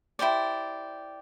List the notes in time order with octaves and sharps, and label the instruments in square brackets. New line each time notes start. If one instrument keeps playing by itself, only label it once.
[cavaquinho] E4 G4 C5 D5